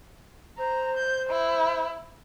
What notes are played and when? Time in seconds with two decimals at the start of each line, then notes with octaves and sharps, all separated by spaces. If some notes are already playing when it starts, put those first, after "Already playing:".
0.58 C5 A#5
0.97 G6
1.29 E4